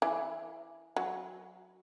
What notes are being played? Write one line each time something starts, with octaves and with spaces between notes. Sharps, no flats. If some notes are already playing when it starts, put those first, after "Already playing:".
E3
F#3